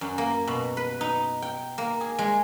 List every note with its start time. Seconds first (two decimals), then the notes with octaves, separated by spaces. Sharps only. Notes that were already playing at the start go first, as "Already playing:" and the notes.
0.01 F#2
0.18 A#3
0.47 B2
0.77 B4
1.01 D#4
1.42 G5
1.78 A#3
2.01 G#4
2.19 G#3